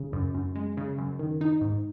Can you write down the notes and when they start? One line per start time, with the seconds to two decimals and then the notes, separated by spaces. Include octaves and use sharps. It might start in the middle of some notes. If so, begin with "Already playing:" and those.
Already playing: C#3
0.13 F#2
0.35 F#2
0.55 G#3
0.77 C#3
0.98 F#2
1.19 D#3
1.41 D#4
1.61 G#2